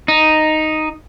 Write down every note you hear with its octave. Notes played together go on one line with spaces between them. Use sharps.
D#4